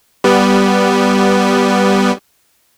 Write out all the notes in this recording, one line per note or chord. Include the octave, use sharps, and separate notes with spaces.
G3 B3